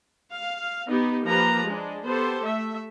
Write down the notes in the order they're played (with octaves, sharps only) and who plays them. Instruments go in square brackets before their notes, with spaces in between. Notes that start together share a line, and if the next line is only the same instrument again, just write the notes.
[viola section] F5
B3 D#4 G4
F3 A#3 G4 B4 A#5
G#3 D4
B3 G4 A4 C5
A3 E5